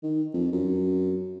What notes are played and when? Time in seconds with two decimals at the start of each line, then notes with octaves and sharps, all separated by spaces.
0.03 D#3
0.34 F2
0.52 F#2